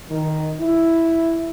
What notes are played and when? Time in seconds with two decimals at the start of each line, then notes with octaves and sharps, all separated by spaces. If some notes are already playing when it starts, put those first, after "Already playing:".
0.11 D#3
0.61 E4